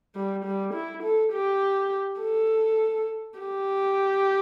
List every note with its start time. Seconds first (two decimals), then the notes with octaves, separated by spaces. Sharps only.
0.15 G3
0.45 G3
0.74 E4
1.03 A4
1.33 G4
2.21 A4
3.39 G4